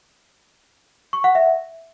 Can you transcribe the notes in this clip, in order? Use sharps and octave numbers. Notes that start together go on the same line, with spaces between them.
C#6
F#5
E5